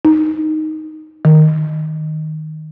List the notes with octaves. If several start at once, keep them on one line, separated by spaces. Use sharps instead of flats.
D#4
D#3